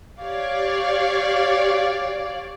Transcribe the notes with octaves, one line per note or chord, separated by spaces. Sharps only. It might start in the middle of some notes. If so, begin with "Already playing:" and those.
G4 C#5 D5 F5